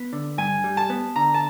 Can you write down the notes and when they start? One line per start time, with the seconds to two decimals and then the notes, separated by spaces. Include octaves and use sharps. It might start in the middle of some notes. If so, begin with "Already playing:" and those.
Already playing: B3
0.13 D3
0.38 G2 G#5
0.64 G3
0.77 A5
0.90 B3
1.16 D3 A#5
1.34 A5